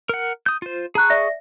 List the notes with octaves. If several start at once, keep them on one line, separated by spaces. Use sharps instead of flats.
A#4 F#5
D#6 G6
F4 C5
G#4 A5 A#5 C#6 F#6
D5 E5 A#6